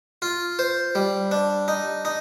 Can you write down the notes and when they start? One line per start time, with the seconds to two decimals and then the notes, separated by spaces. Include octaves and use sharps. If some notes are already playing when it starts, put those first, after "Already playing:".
0.22 F4
0.59 C5
0.95 G3
1.31 D4
1.68 D#4
2.05 D#4